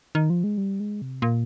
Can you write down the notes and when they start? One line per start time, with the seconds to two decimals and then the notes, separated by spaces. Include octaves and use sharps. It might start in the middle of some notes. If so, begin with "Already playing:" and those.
0.15 D#3
0.30 F3
0.44 G#3
0.58 G3
0.80 G#3
1.02 C3
1.22 A#2